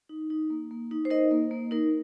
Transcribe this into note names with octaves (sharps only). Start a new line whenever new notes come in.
D#4
D#4
A#3
A#3
D#4
C5
D#4 A#4 D#5
A#3
A#3
D#4 A#4